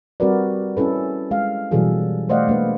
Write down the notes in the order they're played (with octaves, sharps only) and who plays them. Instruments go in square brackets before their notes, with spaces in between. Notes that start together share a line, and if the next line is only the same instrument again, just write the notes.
[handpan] G3 C4 F#4 A#4 B4 D5
C#4 E4 A4 B4
G#3 F5
B2 E3 F#3 G3 G#4 A4
A3 C5 D5 D#5 F5 F#5
G#3 A#3 D4 B4